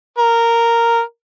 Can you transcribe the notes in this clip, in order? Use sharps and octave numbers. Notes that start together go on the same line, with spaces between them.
A#4